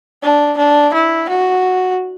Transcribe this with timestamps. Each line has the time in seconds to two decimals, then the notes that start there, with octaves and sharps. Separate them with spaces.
0.23 D4
0.58 D4
0.94 E4
1.30 F#4